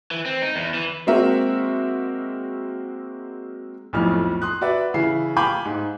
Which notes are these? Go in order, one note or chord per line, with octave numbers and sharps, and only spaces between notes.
E3
C4
D#4
E2
E3
G#3 A#3 C4 F#4 A#4 E5
B1 F2 A2 F6
C6 D#6 F#6
F#4 B4 D5 E5
C#3 E3 E4 C7
F5 G5 G#5 B5 D6 G6
G#2